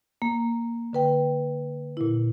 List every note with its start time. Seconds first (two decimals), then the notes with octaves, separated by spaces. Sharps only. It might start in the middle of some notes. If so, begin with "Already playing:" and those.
0.22 A#3
0.93 D3 B4 G5
1.97 A#2 E4